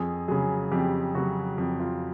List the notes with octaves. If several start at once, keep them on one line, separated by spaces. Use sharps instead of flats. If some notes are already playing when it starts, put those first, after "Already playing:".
Already playing: F2 G#4
C#3 F#3 G#4
F2 G4
C#3 F#3 F#4
F2
F4